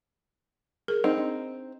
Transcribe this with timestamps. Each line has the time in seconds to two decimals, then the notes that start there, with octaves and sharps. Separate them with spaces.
0.88 G#4 A#4
1.04 C4 D#4
1.17 D4